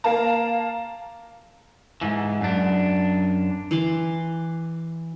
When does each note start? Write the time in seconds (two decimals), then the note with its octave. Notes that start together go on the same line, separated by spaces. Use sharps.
0.04 A#3 F5 A5 A#5
2.01 G#2 E3
2.41 F#2 D4
3.71 E3 C6 D6